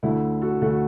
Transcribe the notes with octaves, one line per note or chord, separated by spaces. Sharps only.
D2 D3 A3 E4
F#4 A4
D2 D3 A3 F#4 A4